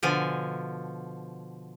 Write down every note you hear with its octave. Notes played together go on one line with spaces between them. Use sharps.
B2 D3 F3 G#5